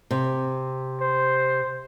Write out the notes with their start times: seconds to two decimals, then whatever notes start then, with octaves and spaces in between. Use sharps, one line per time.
0.11 C3
1.01 C5